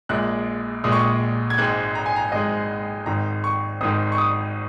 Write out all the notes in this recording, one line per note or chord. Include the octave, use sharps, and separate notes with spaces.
A#1 A#2 G#3 F#6
A#1 A#2 G#3 D#6
C#6
D#6
G#6
G#1 G#2 G#3 F#6
A#5
G#5
A#5
G#1 G#2 G#3 D#5
G#1 G#2 D#3 A#5
C#6
G#1 G#2 D#3 D#6
C#6
D#6